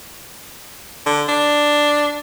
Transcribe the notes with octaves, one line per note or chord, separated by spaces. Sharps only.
D3
D4